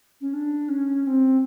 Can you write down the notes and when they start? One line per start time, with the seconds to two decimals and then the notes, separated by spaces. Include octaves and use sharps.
0.21 C#4
0.33 D4
0.69 C#4
1.02 C#4
1.07 C4